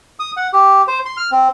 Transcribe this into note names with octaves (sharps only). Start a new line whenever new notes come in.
D#6
F#5
G4
C5
C6
F6
C4